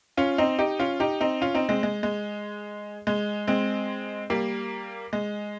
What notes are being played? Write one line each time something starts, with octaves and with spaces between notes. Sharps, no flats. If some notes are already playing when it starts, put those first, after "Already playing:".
C#4 F4
C4 D#4
D#4 G4
C#4 F4
D#4 G4
C4 D#4
C#4 F4
C4 D#4
G#3 C4
G#3
G#3
G#3
G#3 C4
G3 A#3
G#3